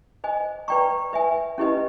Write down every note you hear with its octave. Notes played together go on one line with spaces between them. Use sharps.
C5 D#5 G#5
B4 D5 G5 A#5 C#6
B4 E5 G#5
C#4 E4 G4 B4 D#5